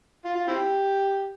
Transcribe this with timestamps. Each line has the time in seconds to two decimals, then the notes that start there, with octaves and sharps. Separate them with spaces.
0.25 F4
0.35 F4
0.48 C4 E4 G4